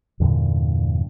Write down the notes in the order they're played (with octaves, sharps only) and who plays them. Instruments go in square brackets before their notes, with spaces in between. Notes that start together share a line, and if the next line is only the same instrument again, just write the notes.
[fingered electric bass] E2 G2 A#2 D3